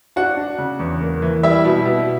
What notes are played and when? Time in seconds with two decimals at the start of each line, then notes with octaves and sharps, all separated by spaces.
0.16 D4 F#4 F#5
0.37 D4
0.58 C#3
0.79 E2
1.01 A#3
1.22 E3
1.43 G3 E4 E5
1.65 B2
1.85 B2